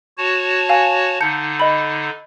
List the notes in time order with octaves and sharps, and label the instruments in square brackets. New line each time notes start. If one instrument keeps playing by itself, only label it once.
[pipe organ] F#4 C#5 A5
[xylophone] F5 G#5
[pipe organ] D3 D#4 [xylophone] A5 G6 C#7
[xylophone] D#5 B5